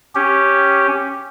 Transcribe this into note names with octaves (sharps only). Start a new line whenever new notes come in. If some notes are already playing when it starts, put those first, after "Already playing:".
C#4 G4